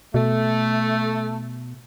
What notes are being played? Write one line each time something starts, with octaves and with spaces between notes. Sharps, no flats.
B2 A3